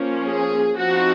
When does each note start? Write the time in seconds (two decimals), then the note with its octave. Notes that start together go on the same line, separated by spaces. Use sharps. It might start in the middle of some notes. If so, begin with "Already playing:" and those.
Already playing: F3 A#3 C#4
0.28 G#4
0.77 F3 C4 D#4 F#4